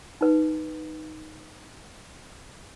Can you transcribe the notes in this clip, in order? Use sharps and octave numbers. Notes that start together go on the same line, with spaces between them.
D#4 B4